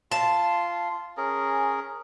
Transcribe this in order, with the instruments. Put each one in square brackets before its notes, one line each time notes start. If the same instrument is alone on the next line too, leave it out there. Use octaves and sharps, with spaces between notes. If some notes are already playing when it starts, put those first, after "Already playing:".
[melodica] F4 C6 [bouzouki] A5
[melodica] C#4 G#4 A#4